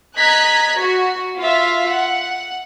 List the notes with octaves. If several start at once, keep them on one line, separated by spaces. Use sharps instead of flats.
D#5 A#5 F#6 G#6 B6
F#4
F4 E5 F5
F#5